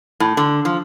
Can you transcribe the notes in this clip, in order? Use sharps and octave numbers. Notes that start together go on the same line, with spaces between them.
A2
D3
F3